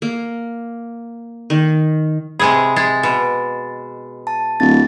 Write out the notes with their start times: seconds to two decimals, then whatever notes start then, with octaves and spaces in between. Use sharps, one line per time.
0.02 A#3
1.50 D#3
2.39 C3 G#3 G#4 B5 D#6 G#6
2.76 G#3 A6
3.03 B2
4.27 A5
4.60 D1 A6